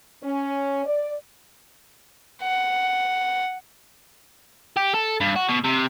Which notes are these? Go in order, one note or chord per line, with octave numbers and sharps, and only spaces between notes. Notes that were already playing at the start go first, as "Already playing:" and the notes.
C#4
D5
F#5
G4
A4
G2
F#4
B2
C3